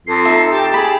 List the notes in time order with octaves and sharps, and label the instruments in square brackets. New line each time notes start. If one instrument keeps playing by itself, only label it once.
[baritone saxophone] F2 [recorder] A4 [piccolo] C7
[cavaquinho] D#4 E5
[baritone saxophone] G4 [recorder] G5 [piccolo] A5
[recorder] G#4 [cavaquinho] B5